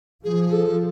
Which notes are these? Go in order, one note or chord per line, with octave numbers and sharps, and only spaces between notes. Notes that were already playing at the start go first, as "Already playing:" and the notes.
F3 G#4
A4